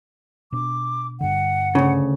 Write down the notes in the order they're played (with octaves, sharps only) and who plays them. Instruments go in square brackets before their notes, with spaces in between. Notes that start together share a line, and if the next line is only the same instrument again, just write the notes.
[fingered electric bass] B2 D4 [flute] D6
[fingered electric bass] G2 D3 [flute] F#5
[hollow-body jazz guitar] D2 C#3